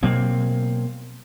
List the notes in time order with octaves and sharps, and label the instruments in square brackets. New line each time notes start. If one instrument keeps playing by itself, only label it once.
[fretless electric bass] B2 F#3 A#3 C4